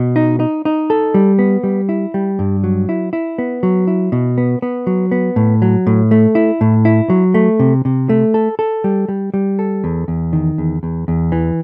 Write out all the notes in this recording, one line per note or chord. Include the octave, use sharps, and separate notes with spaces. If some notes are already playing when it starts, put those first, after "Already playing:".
Already playing: B2
D#4
D#4
D#4
A4
G3
B3
G3
E4
G3
G2
F#3
E4
E4
B3
F#3
E4
B2
B3
B3
F#3
B3
A2
F#3
A2
A3
E4
A2
E4
F#3
A3
C3
C3
A3
A4
A4
G3
G3
G3
A4
E2
E2
D#3
E2
E2
E2
E3